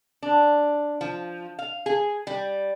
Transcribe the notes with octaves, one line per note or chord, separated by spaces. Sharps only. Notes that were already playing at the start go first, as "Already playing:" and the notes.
D4
F3
F5
G#4
G3